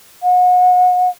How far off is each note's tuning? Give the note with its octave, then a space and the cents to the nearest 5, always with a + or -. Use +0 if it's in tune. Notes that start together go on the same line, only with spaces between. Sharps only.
F#5 -35